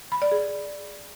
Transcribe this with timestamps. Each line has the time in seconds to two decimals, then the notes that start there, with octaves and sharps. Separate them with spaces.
0.12 B5
0.22 D5
0.32 G#4